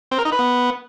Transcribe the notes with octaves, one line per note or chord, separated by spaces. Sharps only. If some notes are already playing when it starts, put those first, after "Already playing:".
C4
A#4
D#4
B4
B3